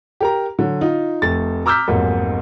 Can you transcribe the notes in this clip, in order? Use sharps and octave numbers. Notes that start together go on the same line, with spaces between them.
G4 A#4 A#5
D3 F#3
D#4 F4
F1 A3 A6
A#5 D6 E6 F6 G6 B6
F1 B1 G#2 A#3